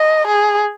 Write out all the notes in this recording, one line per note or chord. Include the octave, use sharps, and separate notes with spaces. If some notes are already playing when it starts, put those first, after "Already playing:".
Already playing: D#5
G#4